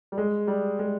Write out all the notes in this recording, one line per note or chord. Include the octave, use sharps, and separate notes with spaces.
G3
G#3
G3
G#3